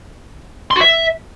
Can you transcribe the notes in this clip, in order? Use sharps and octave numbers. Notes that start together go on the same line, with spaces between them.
C6
F#4
E5